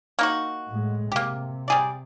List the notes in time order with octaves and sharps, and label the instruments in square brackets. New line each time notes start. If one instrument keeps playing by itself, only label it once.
[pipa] A#3 D#4 F#4
[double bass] A2 G#3
[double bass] C3 [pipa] A#3 G4
[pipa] G3 G#4 D5